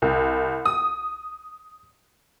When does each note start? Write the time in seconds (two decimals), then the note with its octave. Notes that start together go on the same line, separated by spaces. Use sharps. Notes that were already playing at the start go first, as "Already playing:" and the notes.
0.02 C2
0.65 D#6